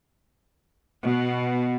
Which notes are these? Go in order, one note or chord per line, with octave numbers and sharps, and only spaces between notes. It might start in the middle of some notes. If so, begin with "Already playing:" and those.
B2